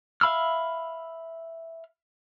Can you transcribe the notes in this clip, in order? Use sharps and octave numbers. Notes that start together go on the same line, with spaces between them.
E5 F5 B5 E6 F6